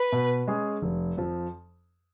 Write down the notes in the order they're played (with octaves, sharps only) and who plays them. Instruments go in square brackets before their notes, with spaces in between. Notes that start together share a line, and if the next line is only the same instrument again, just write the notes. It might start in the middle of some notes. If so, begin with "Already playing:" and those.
Already playing: [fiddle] B4
[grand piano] B2
G#3 C#4 G#4
F1
F2 F3